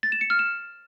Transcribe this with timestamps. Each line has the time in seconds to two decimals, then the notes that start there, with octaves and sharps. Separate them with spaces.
0.03 A6
0.12 E7
0.21 C#7
0.30 F6
0.39 E7